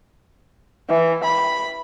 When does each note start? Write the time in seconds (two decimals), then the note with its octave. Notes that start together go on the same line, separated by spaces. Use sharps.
0.90 E3
1.24 B5